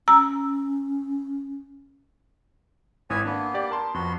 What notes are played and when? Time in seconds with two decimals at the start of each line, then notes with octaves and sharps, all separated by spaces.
0.08 C#4 A#5 E6
3.10 G#1 E4 B4 C#5 G#5 D#6
3.25 A#3 B3 D4
3.54 G4 D5
3.71 A#4 A5 C6
3.94 F2 B3 F#4 C6